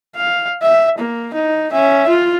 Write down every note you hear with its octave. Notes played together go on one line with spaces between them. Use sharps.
F5
E5
A#3
D#4
C#4 E5
F4